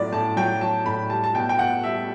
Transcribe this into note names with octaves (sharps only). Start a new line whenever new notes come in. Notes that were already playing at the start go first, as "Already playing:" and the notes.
Already playing: A2 F#3 D5
A2 A5
F#3 G5
F#3 A5
A2 B5
G3 A5
A5
B2 G5
G5
B2 F#5
G3 E5